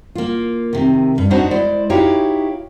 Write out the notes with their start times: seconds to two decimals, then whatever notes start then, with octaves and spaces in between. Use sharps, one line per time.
0.15 A#3 F4
0.73 C3 D#3
1.18 G2
1.30 B3 D4 D#4 F#4 C5 C#5
1.51 G#3 E4 C5 D5
1.90 D#4 E4 F#4 G4 C#5 F5